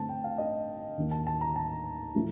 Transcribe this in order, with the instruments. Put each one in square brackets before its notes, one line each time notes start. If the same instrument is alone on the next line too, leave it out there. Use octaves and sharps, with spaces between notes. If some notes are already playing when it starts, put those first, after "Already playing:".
Already playing: [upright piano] G2 D3 A3 C4 A5
G5
F5
D#5
D#2 D#3 A#3
A5
A5
A#5
A5
A2 F3 A3